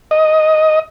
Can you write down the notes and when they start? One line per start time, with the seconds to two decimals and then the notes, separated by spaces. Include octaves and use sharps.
0.11 D#5